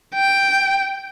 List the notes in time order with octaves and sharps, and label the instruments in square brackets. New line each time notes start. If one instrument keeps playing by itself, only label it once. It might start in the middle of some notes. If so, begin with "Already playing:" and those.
[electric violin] G5